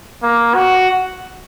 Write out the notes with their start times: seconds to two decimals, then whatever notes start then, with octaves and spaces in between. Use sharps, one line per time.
0.23 A#3
0.55 F#4